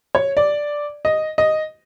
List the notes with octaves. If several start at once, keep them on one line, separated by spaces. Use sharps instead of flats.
C#5
D5
D#5
D#5